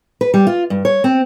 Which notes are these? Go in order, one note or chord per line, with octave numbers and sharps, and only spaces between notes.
B4
G3
F4
G2
C#5
C4